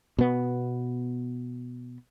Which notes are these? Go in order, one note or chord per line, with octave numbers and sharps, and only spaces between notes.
B2 B3